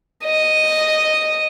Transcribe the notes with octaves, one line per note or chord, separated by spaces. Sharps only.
D#5